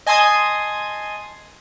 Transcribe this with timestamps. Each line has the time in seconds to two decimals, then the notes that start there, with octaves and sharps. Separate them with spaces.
0.06 D#5 G#5 A5 C6 D#6 G#6